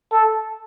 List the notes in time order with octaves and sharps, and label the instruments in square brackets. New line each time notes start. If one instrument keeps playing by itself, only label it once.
[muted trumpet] A4